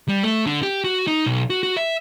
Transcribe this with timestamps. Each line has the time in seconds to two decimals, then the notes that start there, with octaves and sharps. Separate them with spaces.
0.08 G3
0.23 A3
0.46 D3
0.63 G4
0.84 F#4
1.07 D#4
1.26 B1
1.50 F#4
1.63 F#4
1.77 E5